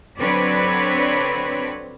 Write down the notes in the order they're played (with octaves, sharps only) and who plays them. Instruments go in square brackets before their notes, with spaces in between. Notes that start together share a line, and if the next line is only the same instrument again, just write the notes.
[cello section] D3 F#3 C4 D4 B4 C#5